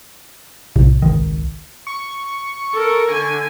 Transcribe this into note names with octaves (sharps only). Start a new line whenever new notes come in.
B1 A2 C3
G#1 C#2 D#3
C#6
A4 A#4
D3 G#5